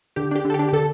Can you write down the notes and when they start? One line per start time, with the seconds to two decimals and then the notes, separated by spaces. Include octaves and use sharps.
0.16 D3 G4
0.31 D4 G4
0.45 D3 A4
0.54 G4
0.59 D4
0.69 G4
0.73 D3 A4